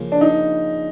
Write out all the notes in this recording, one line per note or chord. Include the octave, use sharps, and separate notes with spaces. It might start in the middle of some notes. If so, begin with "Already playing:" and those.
Already playing: C#3 F3 A#3
D4
D#4